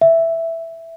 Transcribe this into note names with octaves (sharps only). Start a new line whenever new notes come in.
E5